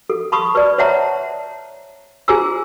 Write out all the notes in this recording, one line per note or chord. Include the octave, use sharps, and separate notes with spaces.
A4
A5 B5 C#6 D#6
B4 D5
C5 C#5 E5 F#5 A5 A#5
F4 G#4 C5 G#5 A#5 E6